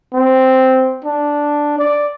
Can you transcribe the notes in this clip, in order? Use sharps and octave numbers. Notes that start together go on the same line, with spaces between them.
C4
D4
D5